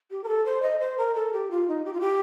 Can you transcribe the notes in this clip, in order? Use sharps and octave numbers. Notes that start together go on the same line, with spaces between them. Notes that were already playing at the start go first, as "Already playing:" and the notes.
G4
A#4
A4
C5
D#5
C5
A#4
A4
G4
F4
D#4
G4
F4
G4